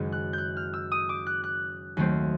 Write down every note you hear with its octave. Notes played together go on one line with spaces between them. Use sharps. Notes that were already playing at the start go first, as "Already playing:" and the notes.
Already playing: F#1 F#2 D#3 G#3
F#6
F#6 G6
F6
E6
D#6
D6
F#6
F#6
D#2 D#3 F#3 A3 C4